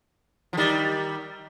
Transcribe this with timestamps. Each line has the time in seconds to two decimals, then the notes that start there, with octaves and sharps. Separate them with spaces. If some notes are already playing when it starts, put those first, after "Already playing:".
0.53 F3
0.57 D#3 G3